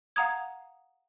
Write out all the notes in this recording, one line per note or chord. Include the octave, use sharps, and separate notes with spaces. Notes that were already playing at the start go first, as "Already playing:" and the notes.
F5 F#5 A#5 D#6 G#6